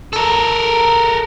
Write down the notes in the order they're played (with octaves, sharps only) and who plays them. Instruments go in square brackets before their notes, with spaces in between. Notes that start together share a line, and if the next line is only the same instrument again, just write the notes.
[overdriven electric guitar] A4 A#4